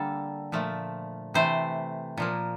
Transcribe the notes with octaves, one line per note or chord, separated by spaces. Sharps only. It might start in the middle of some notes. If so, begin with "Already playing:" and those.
Already playing: D3 G3 A#3 A4
A#2 F3 A3
C3 E3 A3 C5
A#2 F3 A#3